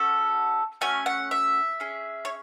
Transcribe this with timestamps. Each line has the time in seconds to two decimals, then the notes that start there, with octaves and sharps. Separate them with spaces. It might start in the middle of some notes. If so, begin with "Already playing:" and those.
Already playing: C#4 F#4 A4
0.81 A3 C#4 F#4 G#5
1.06 F#5
1.31 E5
1.80 C#4 G#4
2.25 C#5